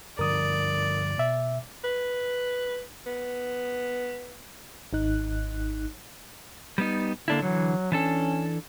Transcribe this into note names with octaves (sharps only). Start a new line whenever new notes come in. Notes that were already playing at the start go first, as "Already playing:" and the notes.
G2 D3 F3 A#4 D5 D#6
B2 E5
B4
B3
G#1 D#4 F#6
G3 B3 D#4
D3 A#3 D4 E4
D3 E3 F#3
E3 C#4 D4 A4